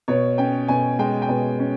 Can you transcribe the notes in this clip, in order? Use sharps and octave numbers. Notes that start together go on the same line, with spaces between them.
B2 C#5
C#4 G5
B2 G#5
G#3 G5
G5
B2
C#4